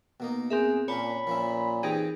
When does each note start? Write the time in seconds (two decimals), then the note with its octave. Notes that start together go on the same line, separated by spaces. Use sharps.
0.20 B2 A#3 D#4
0.50 C4 G#4 A#4 E5
0.88 A#2 C#4 D4 C#5 A5 B5
1.27 A#2 F3 C#4 E4
1.83 E3 C4 D#4 G4 G#4